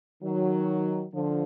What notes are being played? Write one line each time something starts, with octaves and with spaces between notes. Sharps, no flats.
D#3 F#3
D3 F3